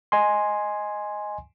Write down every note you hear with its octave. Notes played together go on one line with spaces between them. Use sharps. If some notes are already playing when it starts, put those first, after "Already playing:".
D#5 G#5 C6